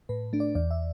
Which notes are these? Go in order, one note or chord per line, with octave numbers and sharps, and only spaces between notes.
A2 B4
A3 D4
D5
E2 D5
E5